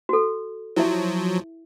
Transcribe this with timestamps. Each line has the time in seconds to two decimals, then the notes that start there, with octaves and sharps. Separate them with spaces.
0.09 F#4 A4
0.76 F3 F#3 E4 E5